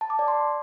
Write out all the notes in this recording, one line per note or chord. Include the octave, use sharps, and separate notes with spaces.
A5
D6
D5
C6